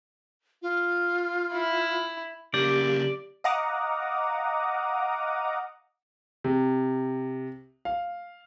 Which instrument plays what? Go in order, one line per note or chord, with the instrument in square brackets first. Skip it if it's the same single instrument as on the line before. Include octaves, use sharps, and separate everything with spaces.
[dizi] F4
[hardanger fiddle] E4
[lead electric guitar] C#3 A#3 [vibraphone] G4 [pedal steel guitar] D5
[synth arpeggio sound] D#5 F5 F#5 A#5 D6 D#6
[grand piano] C3
F5